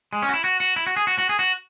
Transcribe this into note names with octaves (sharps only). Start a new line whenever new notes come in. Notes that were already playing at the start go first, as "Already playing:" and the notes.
G#3
C#4
F#4
E4
F#4
F#4
E4
F#4
G#4
F#4
F#4
G#4
F#4